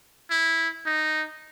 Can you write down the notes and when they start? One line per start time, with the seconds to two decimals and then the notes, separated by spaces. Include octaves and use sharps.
0.30 E4
0.86 D#4